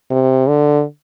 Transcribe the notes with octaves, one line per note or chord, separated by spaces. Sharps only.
C3
D3